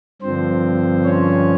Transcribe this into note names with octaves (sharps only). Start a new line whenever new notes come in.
G2 D3 F3 C4 C5
C#4 C#5